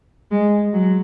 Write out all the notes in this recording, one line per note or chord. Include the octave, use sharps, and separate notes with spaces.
G#3
F#3